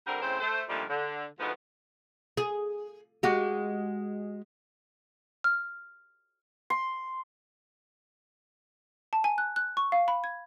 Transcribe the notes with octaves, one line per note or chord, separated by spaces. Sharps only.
D3 G3 C4 D4 A#4
A2 C#3 C4 C5
A3 C5
A#2 D3 D#3 F3 G3 A3
D3
D2 G#2 B2 F3 B3
G#4
G#3 F#4 G4
F6
C6
A5
G#5
F#6
F#6
C#6
F5
B5
G#6